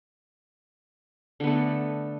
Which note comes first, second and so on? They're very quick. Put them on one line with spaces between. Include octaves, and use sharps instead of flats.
D3 B3 A3